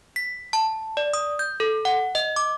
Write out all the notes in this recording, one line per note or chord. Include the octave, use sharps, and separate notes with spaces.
B6
A5
D5
D#6
G6
A4
F#5
D#5
D6